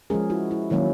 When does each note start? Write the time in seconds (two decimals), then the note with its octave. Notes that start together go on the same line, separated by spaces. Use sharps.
0.10 F3 G#3 C#4 G#4 A#4
0.30 E4 F#4
0.51 E4
0.70 D#3 F#3 A#3 C#4 E4